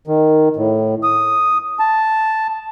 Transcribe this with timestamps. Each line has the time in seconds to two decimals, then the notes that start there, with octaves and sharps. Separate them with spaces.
0.07 D#3
0.56 A2
1.03 D#6
1.80 A5